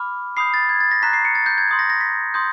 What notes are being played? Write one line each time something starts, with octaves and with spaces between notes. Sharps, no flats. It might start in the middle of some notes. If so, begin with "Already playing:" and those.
Already playing: B5 D6 F6
B5 D#6 G6 C7
A6
G#6
A6
A#6
A#5 C#6 F#6 B6
C7
C#7
A6
G6
G#6
C6 D#6 G6
A#6
A#6
B6
C6 D#6 G6